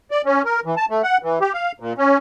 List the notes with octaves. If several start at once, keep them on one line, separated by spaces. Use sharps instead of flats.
D5
C#4
A#4
E3
A5
A3
F#5
E3
G4
F5
A#2
C#4